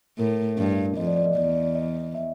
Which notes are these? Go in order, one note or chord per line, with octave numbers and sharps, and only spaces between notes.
A2 A#4
G2
F2 D#5
D5
D5
D#5
E2 D5
D#5
E5